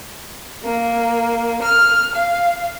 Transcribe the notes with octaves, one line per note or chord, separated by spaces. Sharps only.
A#3
F6
F5